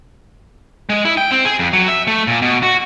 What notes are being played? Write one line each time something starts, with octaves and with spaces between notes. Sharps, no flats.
G#3
E4
G5
C4
G#4
F2
F#3
E5
A3
A#2
B2
F#4